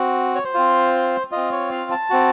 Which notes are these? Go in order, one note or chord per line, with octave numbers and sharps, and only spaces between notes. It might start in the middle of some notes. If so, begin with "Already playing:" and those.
Already playing: C4 F#4
C#5
C5
C4 F4
C4 F4 D#5
C#5
F5
A5
C4 F#4